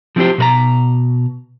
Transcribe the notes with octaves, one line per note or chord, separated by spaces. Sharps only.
F3 A3 C4 E4 G4 C5
B2 B4 A#5